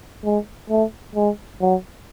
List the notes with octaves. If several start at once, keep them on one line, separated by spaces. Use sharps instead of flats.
G#3
A3
G#3
F#3